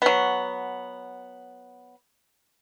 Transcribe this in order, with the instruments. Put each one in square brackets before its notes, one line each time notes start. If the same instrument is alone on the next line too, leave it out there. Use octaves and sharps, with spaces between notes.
[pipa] F#3 B3